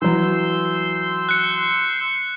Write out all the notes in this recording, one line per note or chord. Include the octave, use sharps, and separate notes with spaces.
E3 F#3 C6 E6 G6
F#6 C#7